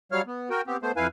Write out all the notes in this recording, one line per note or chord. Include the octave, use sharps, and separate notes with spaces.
F#3 G3 C#5 F5 F6
B3
F#4 A#4 G5
B3 C4 G4
A3 B3 C5
F2 E4 B4 F5 G#5